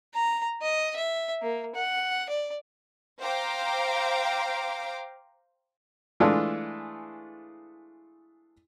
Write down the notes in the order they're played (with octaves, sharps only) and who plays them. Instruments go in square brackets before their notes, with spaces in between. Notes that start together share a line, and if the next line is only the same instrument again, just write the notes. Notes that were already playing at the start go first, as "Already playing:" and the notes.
[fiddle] A#5
D#5
E5
A#3
F#5
D5
[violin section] C5 F5 G5 A#5 D6
[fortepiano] E3 G#3 A3 D4 F4 A4